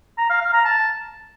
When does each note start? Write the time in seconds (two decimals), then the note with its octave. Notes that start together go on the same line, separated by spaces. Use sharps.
0.18 A#5
0.30 F5
0.41 F5
0.53 A#5
0.65 A5